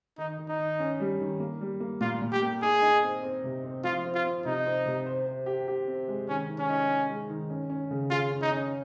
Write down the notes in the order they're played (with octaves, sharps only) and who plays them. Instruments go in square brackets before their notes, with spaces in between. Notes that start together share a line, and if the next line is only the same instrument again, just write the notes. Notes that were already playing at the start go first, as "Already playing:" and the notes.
[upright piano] D#3 [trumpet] D#4
[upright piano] D#3
[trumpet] D#4
[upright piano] D#3
C#4
G3
D#3
A#3
G3
A#3
[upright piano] A#2 [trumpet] F4
[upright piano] A#2
[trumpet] G4
[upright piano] A#3
[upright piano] D#4 [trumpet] G#4
[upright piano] D#4
C4
C4
C3
C4
[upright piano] F3 [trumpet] F4
[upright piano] C4
[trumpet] F4
[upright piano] C4
[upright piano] C3 [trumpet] D#4
[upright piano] C4
C3
C5
C5
G4
G4
C4
G#3
[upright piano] D#3 [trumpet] C#4
[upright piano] D#3
[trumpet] C#4
[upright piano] D#4
D#4
G#3
D#3
C#4
C#4
C#3
[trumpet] F4 [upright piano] G#4
[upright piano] C#4
[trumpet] D#4
[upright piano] C#4